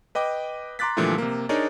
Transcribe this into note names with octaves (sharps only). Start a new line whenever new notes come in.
B4 D#5 G5 D6
A#5 C6 D6 F#6 A6 B6
A#2 D3 E3 F3 G3 A3
C3 A#3
D4 D#4 G#4 A#4 C#5 D5